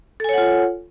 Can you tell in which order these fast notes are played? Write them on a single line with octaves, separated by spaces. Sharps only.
A4 G#5 C#5 F#5 F4